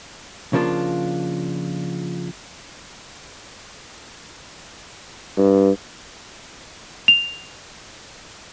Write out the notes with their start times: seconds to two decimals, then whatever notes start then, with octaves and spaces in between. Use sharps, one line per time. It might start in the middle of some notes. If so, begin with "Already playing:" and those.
0.53 C#3 F3 A#3 D4 F4
5.38 G2
7.08 F7